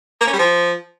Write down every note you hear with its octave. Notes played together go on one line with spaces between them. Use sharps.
A#3
C#4
G3
F3